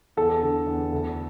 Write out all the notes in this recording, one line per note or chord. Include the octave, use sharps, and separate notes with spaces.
E2 A4
D3
E2
D2